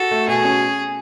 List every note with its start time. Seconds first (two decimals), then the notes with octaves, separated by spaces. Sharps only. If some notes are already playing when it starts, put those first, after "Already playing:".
Already playing: F#4 A4
0.11 A3
0.28 B2 G#4
0.45 C#4